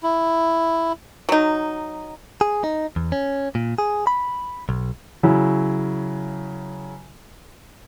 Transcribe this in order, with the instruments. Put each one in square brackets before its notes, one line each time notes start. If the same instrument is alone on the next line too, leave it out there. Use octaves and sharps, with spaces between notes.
[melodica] E4
[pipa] F#3 D#4
[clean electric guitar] G#4
D#4
E2
C#4
A#2
G#4
B5
B1
[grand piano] C#3 F#3 E4